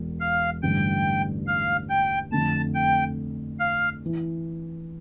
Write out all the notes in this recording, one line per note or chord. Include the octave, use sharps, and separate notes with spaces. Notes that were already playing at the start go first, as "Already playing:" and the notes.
Already playing: E1 E2
F5
A1 G2 D3 G5
F5
G5
F2 D3 A3 A5
G5
F5
E3